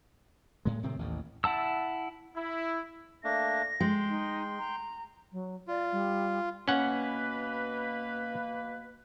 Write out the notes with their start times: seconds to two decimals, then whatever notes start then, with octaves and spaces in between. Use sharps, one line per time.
0.65 A2 G#3
0.83 A2 C3 D#3 C4
0.99 A1 D#2 A2
1.44 E4 F#5 A5 E6
2.36 E4
3.24 A3 A#3 D4 A#6
3.80 G#3 G5 C6
4.09 D#4
4.59 A#5
5.32 F#3
5.68 F4 D5
5.91 G3
6.68 B2 A#3 C#4 B4 F#5